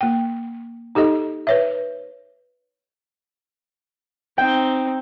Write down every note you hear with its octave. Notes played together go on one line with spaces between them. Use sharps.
A#3 G5
D#4 G4 A4 D#5
B4 C#5 E5
C4 D#4 G5